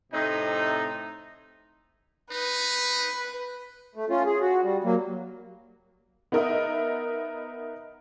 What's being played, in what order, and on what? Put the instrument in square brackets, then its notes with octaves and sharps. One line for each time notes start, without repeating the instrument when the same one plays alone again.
[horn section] A2 C3 C4 D#4
[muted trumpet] D#4 [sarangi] B4
[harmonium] A3
C#4 F4
G#4
F#4
G3
F#3 A#3
[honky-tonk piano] B3 D#4 A#4 D#5 E5